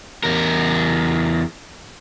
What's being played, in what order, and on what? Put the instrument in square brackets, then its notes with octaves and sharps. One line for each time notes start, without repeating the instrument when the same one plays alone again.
[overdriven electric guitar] E2 A#4